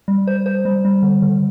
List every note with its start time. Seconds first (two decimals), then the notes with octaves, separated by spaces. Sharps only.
0.08 G3
0.27 C5
0.46 C5
0.65 G3
0.85 G3
1.03 D3
1.22 D3